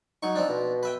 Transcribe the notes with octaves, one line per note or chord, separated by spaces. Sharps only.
F#3 D#4 C#6
F3 C4 D4
B2
B4 E5 G5